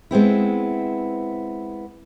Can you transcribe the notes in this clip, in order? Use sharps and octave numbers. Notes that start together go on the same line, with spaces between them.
G#3 B3 C4 E4